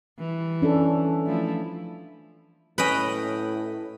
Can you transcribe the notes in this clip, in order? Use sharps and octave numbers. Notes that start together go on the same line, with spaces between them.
E3 G3
C#4 D4 A4
F3 A3 E4
A2 C#4 B4 D#5 G5 B5